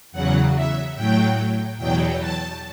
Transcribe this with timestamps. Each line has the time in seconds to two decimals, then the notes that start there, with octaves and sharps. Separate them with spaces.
0.12 E2 C#3 F#3 F#5
0.54 E5
0.95 A2 F#3 G5
1.77 E2 B2 F#3 G5
2.19 A5